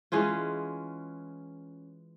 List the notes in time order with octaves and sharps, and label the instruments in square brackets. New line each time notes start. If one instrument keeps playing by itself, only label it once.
[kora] E3 G#3 C#4 F4